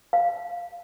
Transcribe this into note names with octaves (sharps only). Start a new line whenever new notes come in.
F5